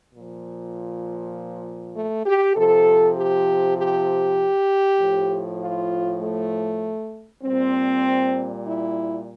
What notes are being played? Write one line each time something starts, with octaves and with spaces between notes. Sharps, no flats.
A#2 F3
A3
G4
C3 F3 A4
G4
G4
A2 F3
F4
A3
A#2 G3 C4
E4